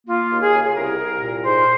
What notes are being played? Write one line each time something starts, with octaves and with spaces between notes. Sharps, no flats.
A#3 F4
D#2
G#4
C#3
G#4
C2 A#4
C2
A#2
G#2 C5